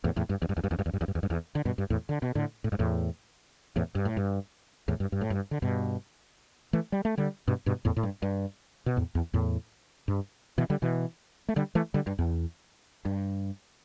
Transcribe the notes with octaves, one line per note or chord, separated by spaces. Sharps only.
E2 A2
E2 A2
G2
E2
G2
E2
G2
E2
G2
E2
G2
E2
G2
E2
G2
E2
D3
G2 B2
G2
E2 A2
D3
B2
A2 D3
A2
G2
E2 A2
E2 A2
G2
A2
G2
E2 A2
G2
G2
A2
G2
D3
G2 B2
E3 A3
G3
A3
D3 G3
G2 B2
G2 B2
E2 A2
A2
G2
G2
B2
E2 A2
E2
E2 A2
G2
B2 E3
D3 G3
B2 E3
A3
D3 G3
E3 A3
D3 G3
G2
E2
G2